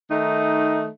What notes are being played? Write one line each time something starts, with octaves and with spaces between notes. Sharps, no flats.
D#3 A3 D#4